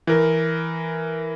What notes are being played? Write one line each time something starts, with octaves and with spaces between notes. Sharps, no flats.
E3 A#4